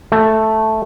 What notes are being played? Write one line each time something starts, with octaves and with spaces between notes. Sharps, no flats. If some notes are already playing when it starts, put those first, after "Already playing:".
A3